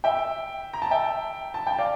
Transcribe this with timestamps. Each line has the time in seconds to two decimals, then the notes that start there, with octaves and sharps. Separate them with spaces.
0.04 E5 G5
0.73 A#5
0.82 A5
0.91 E5 G5
1.54 A5
1.67 G5
1.78 D5 F5